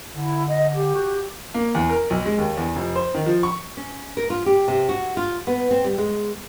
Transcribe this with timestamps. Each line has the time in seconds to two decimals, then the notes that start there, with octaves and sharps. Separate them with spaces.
0.13 D3 E4
0.47 D#5
0.73 G4
0.94 F#4
1.54 A#3
1.75 E2
1.90 A#4
2.10 B1
2.26 G#3
2.38 D#2
2.57 E2
2.76 F1
2.95 C5
3.14 D#3
3.26 F3
3.43 C#6
3.77 C#4
4.17 A#4
4.30 F4
4.46 G4
4.68 C3
4.89 F#4
5.17 F4
5.47 B3
5.71 C4
5.85 G3
5.98 G#3